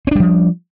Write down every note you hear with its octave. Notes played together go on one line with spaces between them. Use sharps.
F3 G3 C4 D4